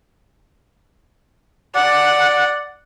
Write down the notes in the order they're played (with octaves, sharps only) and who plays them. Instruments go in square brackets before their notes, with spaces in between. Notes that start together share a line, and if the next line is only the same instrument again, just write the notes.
[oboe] D5 [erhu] F#5